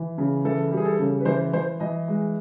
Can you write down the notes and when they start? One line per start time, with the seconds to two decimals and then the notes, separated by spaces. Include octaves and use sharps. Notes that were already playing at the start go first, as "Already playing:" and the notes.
Already playing: E3
0.18 C#3
0.45 E3 A4
0.71 G3
0.77 G#4
0.85 A4
0.99 C#3
1.20 B4
1.25 E3 C5
1.53 E3 C5
1.80 E3 D#5
2.08 G#3